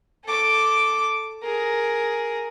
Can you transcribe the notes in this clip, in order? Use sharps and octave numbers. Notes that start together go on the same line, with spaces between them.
A4 D6
G#4 A#4